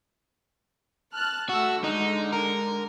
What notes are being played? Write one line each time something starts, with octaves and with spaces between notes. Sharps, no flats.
A5 F6 F#6
A3 F#4 E6
D3 G#3 D#4
A#4